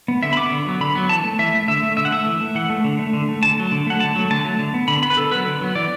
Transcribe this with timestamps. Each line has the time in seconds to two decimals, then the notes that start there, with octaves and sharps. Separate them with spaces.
0.08 B3
0.23 D3 E5
0.33 B5
0.37 B3 D6
0.51 D3
0.66 F#3 B3
0.81 D3 B5
0.95 F#3 B3
1.09 E3 A5
1.24 A3
1.39 E3 E5
1.54 A3
1.68 D3 E5
1.83 A3
1.97 D3 E5
2.05 F#5
2.12 A3 E5
2.26 E3
2.41 A3
2.55 E3 F#5
2.70 A3
2.84 D3
2.99 A3
3.13 D3
3.29 A3
3.43 D3 A5
3.58 F#3 A3
3.72 D3
3.87 F#3 A3 F#5
4.00 D3 A5
4.16 F#3 A3
4.30 D3 A5
4.44 F#3 A3
4.59 D3
4.74 B3
4.88 D3 B5
5.03 B3 B5
5.10 B4
5.17 D3 A4
5.31 F#3 B3 B4
5.47 D3
5.61 F#3 B3
5.75 E3 D5